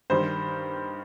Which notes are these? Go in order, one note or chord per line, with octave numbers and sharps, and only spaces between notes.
G2 D#3 G3 C5